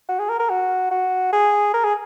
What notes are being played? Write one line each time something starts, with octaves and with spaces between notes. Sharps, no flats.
F#4
G#4
A#4
A#4
F#4
F#4
G#4
A#4
G#4